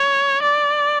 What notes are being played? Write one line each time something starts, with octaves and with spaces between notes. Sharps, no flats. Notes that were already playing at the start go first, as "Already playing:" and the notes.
Already playing: C#5
D5